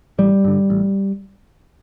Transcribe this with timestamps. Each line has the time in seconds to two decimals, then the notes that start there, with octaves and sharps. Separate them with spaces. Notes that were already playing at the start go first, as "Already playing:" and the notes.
0.19 A1 G3
0.44 G2 D3
0.70 A1